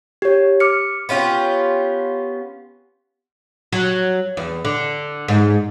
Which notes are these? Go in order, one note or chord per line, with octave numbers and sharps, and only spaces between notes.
G4 C#5
D6 F6 C#7
B3 C#4 F4 G4
F#3
E2
D3
G#2